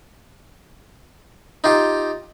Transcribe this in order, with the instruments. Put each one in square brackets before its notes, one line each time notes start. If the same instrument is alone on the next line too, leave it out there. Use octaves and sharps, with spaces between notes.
[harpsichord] D#4 F4 G4